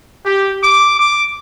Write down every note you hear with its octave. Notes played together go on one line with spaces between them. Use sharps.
G4
D6
D6